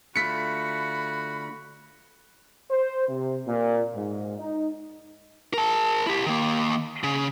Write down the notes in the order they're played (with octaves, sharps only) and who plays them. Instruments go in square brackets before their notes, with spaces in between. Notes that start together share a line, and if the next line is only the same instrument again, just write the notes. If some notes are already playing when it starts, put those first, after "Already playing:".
[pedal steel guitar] D3 A3 F4 [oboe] F#4 [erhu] B5 [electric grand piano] B6 C#7
[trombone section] C5
C3
A#2
G#2
D#4
[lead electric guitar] A#4 A5
E4 G4
D#3 A#3
C#3